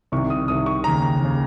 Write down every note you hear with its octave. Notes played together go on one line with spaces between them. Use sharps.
C2 C3 D#3 C#6
D#6
C2 C3 D#3 D#6
C#6
D#2 C#3 A#5
D#2 C#3